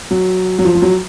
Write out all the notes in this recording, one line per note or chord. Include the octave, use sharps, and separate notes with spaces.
F#3
F#3
F3
F3
F#3